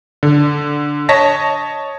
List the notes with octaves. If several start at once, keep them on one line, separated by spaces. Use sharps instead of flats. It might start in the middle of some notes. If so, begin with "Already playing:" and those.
D3
C#5 D#5 A5 A#6 B6